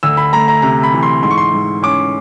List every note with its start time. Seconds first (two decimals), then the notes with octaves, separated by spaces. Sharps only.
0.03 D2 E6
0.17 B5
0.33 A3 A#5
0.48 A#5
0.62 C3 A#5
0.83 B5
0.93 E3
1.03 C6
1.23 G#2 C6
1.30 C#6
1.38 C6
1.53 G#2
1.82 C#4 D6